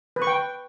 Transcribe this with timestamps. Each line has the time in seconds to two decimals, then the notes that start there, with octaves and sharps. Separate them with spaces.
0.16 B4
0.22 C#6
0.27 G5